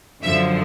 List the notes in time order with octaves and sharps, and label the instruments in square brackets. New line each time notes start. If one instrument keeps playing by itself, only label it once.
[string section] F#2 D3 F3 E5